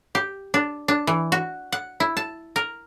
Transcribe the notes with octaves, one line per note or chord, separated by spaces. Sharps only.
G4
D4
D4
E3
F#4
F#5
E4
A5
A#4